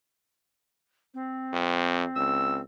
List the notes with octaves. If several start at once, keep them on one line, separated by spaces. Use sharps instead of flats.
C4
F2
C#2 E6